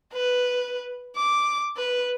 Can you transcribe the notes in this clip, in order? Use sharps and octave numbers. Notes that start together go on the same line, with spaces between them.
B4
D6
B4